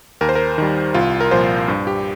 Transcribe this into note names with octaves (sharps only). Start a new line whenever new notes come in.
D#2 A#4
C5
A#4
D#3 G3
C2 F4
A#4
A#2 F3 C5
G2
G4